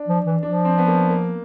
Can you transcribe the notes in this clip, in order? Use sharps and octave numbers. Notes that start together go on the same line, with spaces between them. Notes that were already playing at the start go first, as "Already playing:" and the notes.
Already playing: D4
F3
E3
F3 D4
C4
B3
A#3
A#3